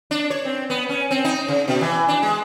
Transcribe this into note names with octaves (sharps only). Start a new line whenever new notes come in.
D4
C#5
C4
B3
C#4
C4
D#4
C#3
B2
E3
D4
G#3